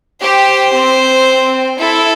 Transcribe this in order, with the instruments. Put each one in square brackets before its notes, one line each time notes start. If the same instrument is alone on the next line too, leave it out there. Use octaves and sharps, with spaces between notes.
[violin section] G4 [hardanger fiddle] C5
[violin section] C4
[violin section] E4 [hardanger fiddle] A4